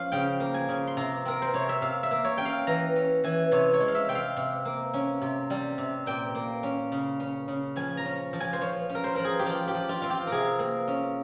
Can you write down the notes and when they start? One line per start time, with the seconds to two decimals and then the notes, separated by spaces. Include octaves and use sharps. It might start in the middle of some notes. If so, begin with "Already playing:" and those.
Already playing: F3 C#4 F5
0.12 C#3 G5
0.40 A#3
0.54 G#5
0.69 C#3
0.87 C6
0.97 C3 A#5
1.25 C4 A#4
1.42 C5
1.54 C3 C#5
1.69 E5
1.82 C3 F5
2.03 E5
2.11 A#3
2.25 C#5
2.38 C#4 G5
2.46 F5
2.67 E3 A#5
2.96 C#4
3.24 E3 G#5
3.52 C3 C#5
3.74 C#5
3.80 G#3
3.88 F5
3.95 E5
4.08 C3 G5
4.15 F5
4.37 C3
4.65 A#3
4.94 C#4
5.22 C3
5.50 G3
5.78 C3
6.06 A#2 G5
6.35 A#3
6.63 C#4
6.92 C#3
7.20 C#4
7.48 C#3
7.76 F3 G#5
7.97 A#5
8.05 C#4
8.33 F3
8.40 G#5
8.53 C5
8.61 F3 C#5
8.89 C#4
8.95 A#4
9.04 C5
9.15 F3 A#4
9.25 G#4
9.39 G4
9.46 F3 F4
9.68 G4
9.74 F3
9.89 F4
10.02 C4 F4
10.10 G4
10.27 C3 G#4 A#4
10.59 A#3
10.88 C#4